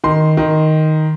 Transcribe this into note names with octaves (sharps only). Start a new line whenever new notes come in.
D#3 C6
D#3